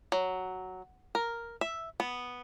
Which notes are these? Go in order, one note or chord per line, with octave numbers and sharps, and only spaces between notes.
F#3
A#4
E5
B3